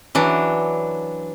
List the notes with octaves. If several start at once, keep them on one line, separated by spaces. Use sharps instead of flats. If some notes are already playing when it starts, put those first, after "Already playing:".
E3 F#3 D4